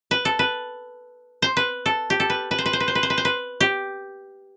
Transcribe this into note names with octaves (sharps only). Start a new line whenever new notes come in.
B4
A4
B4
C5
B4
A4
G4
A4
B4
B4
C5
B4
C5
B4
C5
B4
C5
B4
C5
B4
G4